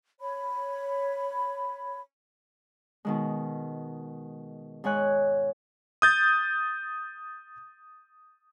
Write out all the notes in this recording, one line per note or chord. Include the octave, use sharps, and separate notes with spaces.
C#5 B5
B2 D#3 G#3
G#2 G#3 C#5 G#5 F#6
D#6 G6 A6